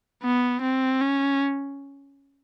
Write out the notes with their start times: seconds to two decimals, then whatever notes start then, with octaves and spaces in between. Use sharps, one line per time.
0.23 B3
0.61 C4
1.00 C#4